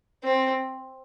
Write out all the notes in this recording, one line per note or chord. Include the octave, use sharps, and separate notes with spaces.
C4